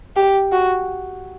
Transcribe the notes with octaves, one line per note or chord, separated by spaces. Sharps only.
G4
F#4